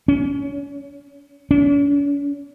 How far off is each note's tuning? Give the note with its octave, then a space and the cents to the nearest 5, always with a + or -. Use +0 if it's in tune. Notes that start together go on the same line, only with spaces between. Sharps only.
C#4 +30
C#4 +45